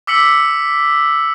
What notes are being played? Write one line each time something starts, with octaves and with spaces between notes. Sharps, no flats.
D6 E6 B6 C#7 F#7